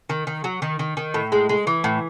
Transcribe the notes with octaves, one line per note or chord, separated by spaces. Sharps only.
D#3
D#3
F#3
D#3
D#3
D#3
A2
G#3
G#3
E3
A2